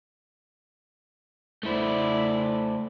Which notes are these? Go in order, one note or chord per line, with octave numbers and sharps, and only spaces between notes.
A3 E4 C5 D5